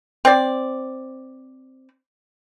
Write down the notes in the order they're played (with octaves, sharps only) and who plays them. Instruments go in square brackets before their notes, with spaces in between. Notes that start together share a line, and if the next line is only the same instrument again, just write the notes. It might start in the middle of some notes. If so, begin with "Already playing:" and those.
[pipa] C4 D5